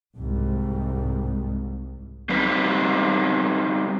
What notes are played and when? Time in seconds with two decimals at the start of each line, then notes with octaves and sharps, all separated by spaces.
0.15 C2 G#2
2.29 G3 C4 D#4 B4